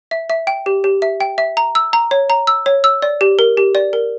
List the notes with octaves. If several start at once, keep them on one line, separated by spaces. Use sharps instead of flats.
E5
E5
G5
G4
G4
E5
G5
E5
A#5
E6
A#5
C#5
A#5
E6
C#5
E6
D5
G4
A#4
G4
D5
A#4